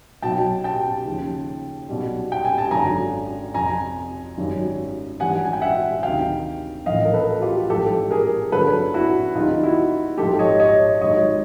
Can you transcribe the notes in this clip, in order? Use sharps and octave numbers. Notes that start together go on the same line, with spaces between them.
B1 B2 F#3 G5 A5
G5 A5
D#2 C#3 F3
B1 B2 G3
G5
G#5
A5
G#1 F#2 D3 G#5 A#5
F2 C3 F3 G#5 A#5
G#1 F#2 D#3 G3
G#1 G2 E3 G3 F#5 G#5
G#5
G5
E5 F#5
D2 C3 D#3 F5 G5
A#1 A2 E3 D#5 F5
A#4
A4 B4
F#4
F4 G4
A1 G#2 F3 G4 A4
G#4 A#4
G1 G2 D3 F#3 A4 B4
E4 F#4
D#2 D#3 G3 D#4 F4
E4 F#4
G#1 G#2 F3 G4 A4
C#5 D#5
C#5 D#5
G#1 G#2 D#3 G3 C#5 D#5